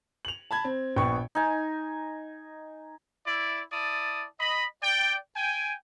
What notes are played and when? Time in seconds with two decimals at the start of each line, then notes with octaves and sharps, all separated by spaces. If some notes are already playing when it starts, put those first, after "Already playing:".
0.25 F7 F#7
0.51 A5 B5 G#6
0.64 C4
0.96 A#1 B3 G5 C#6
1.35 D#4 G#5
3.26 E4 D5
3.71 E4 D5 A5 D#6
4.39 D#5 B5
4.81 D5 G5
5.36 G5 G#5